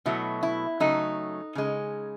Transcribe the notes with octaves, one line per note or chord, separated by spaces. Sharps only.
B2 F#3 A3 E4
E4
C#3 F#3 A3 D#4
C#3 G#3